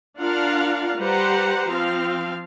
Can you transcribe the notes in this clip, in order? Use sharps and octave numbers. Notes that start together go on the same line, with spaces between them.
D4 F4 A#4 F5 F#5
G3 G4 B4 C5 F#5 A#5
F3 C4 F5